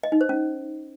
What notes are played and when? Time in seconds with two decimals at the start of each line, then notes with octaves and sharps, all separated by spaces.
0.03 D#5
0.12 D#4
0.21 C5
0.29 C#4